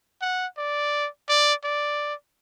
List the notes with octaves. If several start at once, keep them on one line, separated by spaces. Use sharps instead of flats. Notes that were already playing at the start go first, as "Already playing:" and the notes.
F#5
D5
D5
D5